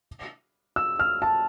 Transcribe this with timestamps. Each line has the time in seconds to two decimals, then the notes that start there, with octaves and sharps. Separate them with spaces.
0.76 E6
0.99 F6
1.22 A5